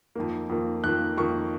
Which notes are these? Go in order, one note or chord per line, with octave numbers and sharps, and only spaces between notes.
F2 D#3 A#3
F2 D#3 A#3
F2 D#3 A#3 F#6
F2 D#3 A#3 C#6